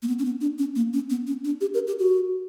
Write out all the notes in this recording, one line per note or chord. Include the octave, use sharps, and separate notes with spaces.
A#3
B3
C#4
B3
D4
C#4
A#3
C#4
B3
C#4
D4
G4
A#4
G4
F#4